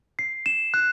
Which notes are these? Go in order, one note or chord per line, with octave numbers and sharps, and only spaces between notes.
C7
E7
F#6